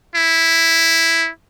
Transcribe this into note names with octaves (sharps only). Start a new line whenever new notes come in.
E4